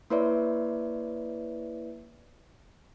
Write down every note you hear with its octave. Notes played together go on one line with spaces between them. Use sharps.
A#3 E4 B4 C#5 D5 E5